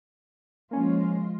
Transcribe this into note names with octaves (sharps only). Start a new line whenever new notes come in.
F3 G#3 A#3 C#4 F4